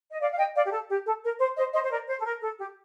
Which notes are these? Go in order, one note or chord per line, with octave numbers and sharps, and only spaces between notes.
D#5
D5 F5
F5
D#5 G5
D5 F5
G4
A4
G4
A4
A#4
C5
C5 D#5
C5 D#5
C5
A#4 D5
C5
A4
A#4
A4
G4